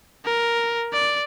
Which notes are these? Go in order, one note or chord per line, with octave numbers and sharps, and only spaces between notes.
A#4
D5